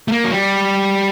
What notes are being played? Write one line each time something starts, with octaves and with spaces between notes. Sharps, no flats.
A3
A#3
F#3
G3